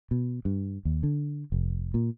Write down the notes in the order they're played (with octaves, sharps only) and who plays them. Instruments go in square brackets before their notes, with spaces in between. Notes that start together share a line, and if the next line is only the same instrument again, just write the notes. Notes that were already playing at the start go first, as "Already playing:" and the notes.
[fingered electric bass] B2
G2
D#2
D3
F1
A#2